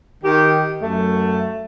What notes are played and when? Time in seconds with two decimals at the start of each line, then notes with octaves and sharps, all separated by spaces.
0.24 D#3 G4
0.82 F#2 A3